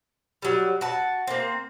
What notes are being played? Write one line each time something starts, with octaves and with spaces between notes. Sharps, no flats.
F#3 G3
F#4 A5
A#3 C4